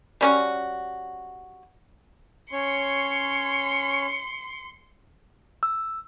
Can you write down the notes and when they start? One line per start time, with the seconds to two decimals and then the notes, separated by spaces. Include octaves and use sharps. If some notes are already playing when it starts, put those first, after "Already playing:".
0.21 G3 C#4 F#4
2.52 C#4 C#5 C6 C#6 C#7
5.63 E6